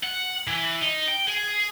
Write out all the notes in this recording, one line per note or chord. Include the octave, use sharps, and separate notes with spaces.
F#5
E3
D#4
G5
G#4